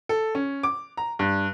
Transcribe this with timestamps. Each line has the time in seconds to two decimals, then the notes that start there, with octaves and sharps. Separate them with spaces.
0.09 A4
0.35 C#4
0.63 D6
0.97 A#5
1.19 G2